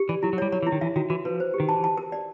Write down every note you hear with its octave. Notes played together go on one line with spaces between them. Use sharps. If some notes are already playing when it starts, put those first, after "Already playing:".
Already playing: G4
E3 D5
F#3 E4
F#3
G3 C#5
F#3 C#5
E3
E4
D#3
E3 E5
D#3 F#4
E3 F#4
F3 B4
C5
G4
D#3
E3 A5
A5
A#4
D5